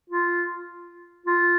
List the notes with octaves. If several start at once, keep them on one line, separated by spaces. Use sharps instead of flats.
F4
F4